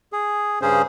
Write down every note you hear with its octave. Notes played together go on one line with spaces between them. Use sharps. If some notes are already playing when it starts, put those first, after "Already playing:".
G#4
G2 C#3 C#4 G#4 C5